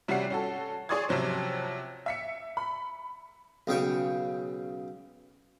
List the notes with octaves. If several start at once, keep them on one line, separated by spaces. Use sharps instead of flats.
C3 G3 C#4 F#4 F#5 C7
C#4 F#4 A4
G#4 C#5 D5 C6 D#6 G#6
C3 F3 F#3 C4 C#4
E5 B6 C#7
B5
B1 C#3 G5 C#6